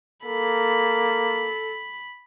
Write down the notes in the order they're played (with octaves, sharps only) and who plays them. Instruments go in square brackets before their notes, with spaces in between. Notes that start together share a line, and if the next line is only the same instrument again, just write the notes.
[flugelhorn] A#3 [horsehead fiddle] A4 [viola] B5